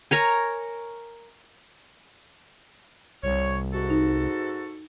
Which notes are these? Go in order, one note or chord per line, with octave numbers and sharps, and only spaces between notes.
A#4 C#5 G#5
C2 C#5
G#2 F#4 A4
D#4